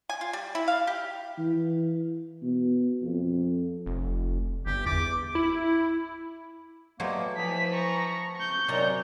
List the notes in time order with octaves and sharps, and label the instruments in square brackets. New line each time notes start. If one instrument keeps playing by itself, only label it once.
[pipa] G#5
F4
G3
E4
F5
G4
[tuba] E3
B2
F2
[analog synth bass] F1
[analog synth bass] G1 [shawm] G4
[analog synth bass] E2 [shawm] D6
[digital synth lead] E4
[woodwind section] B2 G3 A#3 [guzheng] F#3 A3 C5
[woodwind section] E3 F3 [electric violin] B6
[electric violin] A#5 C#6
C#6 G6
[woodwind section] F#2 D#3 F#3 [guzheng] C3 D5 A#5